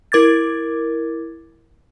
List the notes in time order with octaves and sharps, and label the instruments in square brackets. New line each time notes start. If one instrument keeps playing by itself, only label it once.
[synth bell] E4 A#4 D6 G#6 A6